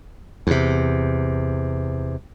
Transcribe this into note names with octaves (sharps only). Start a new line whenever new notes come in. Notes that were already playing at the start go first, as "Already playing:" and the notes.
E2 C3